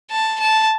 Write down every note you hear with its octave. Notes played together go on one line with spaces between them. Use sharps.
A5
A5